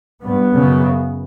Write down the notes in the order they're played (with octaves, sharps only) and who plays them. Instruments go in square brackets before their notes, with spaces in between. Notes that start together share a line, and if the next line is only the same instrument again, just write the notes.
[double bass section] G2 B3
F#2 C#3